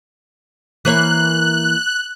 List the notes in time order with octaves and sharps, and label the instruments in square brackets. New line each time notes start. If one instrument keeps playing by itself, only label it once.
[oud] E3 A#3 C#5 [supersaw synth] F#6